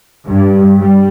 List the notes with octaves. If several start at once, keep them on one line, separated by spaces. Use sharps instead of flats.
G2
G3